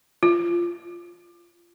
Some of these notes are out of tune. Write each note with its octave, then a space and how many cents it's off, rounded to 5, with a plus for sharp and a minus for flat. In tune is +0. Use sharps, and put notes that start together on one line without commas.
F4 -20